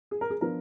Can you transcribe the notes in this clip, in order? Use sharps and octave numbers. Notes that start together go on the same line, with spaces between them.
G#4
A#4
G#4
F3 B3 D4 A#4